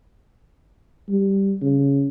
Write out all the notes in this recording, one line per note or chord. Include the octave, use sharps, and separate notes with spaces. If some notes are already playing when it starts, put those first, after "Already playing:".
G3
C#3